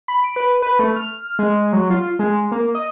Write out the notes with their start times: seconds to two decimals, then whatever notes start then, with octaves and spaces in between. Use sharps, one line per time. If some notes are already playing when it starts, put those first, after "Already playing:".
0.08 B5
0.24 D7
0.36 B4
0.62 B4
0.79 A3
0.96 F6
1.39 G#3
1.73 F#3
1.90 F4
2.19 G#3
2.52 A#3
2.75 D#5